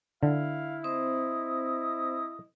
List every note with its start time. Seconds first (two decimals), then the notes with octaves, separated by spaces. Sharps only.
0.23 D3 E4 F5
0.84 C4 C5 D#5